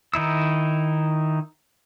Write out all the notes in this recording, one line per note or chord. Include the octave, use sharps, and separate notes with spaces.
D#3 D#4 E4 E6